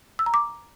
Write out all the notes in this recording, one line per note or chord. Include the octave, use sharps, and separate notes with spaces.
E6
A#5
D6